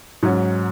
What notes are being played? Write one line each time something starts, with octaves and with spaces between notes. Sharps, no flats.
G#2 F#3 C#4